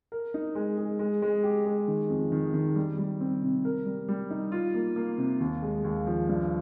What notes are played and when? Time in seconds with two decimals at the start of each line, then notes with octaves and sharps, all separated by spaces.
0.12 A#4
0.34 D#4
0.55 G#3
0.78 G#3
0.99 G#3
1.22 G#3
1.43 G4
1.66 G#3
1.88 D#3
2.10 F2
2.32 D#3
2.54 D#3
2.76 G3
2.98 G3
3.20 C4
3.42 C3
3.65 A#4
3.86 G3
4.08 G3
4.31 D#4
4.52 F4
4.74 A#3
4.96 A#3
5.18 C3
5.40 D#2
5.62 G#3
5.84 D#2
6.07 F3
6.29 G2